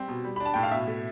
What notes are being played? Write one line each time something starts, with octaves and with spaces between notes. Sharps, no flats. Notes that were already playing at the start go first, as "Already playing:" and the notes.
Already playing: G3 C4
B2
G3
B5
D4
A5
A2 G5
F5
B2 E5
A3